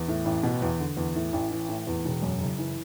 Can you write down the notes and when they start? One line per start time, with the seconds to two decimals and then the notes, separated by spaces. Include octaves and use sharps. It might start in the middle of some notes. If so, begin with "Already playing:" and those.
Already playing: E2
0.08 A2
0.25 A1
0.43 B2
0.62 E2
0.79 D3
0.97 E2
1.15 A2
1.33 A1
1.51 E3
1.69 A2
1.87 E2
2.05 E1
2.22 F#2
2.41 F#1
2.58 E3